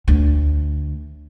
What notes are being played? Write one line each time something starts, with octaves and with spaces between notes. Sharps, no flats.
D2